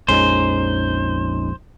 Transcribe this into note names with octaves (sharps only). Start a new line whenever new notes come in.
A#1 F2 G#3 C#4 D#4 C5